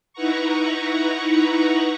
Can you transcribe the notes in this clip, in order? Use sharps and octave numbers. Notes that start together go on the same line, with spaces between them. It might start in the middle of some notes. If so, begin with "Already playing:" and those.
D#4 E4 B4 F#5 A#5 C#6